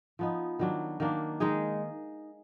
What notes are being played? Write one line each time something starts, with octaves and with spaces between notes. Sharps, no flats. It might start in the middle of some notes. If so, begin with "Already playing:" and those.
F3 B3 D#4
D#3 F#3 D4
D#3 A#3 D4
D#3 G#3 D#4 G#4